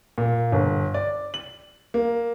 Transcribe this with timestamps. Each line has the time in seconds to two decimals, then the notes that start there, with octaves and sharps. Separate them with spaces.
0.18 A#2
0.52 G1
0.94 D5
1.34 F#7
1.94 A#3